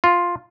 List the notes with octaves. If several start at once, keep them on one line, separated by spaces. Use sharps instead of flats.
F4